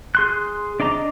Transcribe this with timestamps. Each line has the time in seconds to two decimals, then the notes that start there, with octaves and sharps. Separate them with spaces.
0.15 G#4 C6 F#6
0.80 D4 D5 D#5 A#5 D6